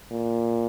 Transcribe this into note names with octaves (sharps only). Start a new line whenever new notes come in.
A#2